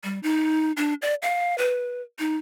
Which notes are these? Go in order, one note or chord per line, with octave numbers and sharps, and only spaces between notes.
G3
D#4
D4
D5
F5
B4
D#4